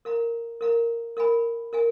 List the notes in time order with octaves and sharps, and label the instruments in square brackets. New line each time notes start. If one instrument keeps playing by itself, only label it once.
[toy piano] A#4 F5 A#5
A#4 F5 A#5
A#4 F5 G#5 B5
A#4 F5 G#5